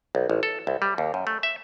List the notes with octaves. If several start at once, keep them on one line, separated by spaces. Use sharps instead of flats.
B1
A1
A4
C2
G3
D#2
F#2
A3
E5